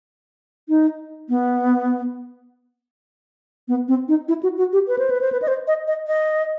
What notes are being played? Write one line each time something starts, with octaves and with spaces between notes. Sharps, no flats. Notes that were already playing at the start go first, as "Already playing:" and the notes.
D#4
B3
B3
C4
D#4
E4
F#4
F#4
G4
B4
C5
B4
C5
B4
D#5
C5
D#5
D#5
D#5